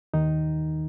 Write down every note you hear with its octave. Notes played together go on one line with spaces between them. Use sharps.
D#2 D#3 D#4